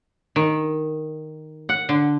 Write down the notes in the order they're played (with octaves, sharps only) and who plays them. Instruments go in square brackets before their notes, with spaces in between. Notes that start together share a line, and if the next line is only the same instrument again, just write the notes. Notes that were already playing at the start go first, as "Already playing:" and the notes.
[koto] D#3
F#5
D3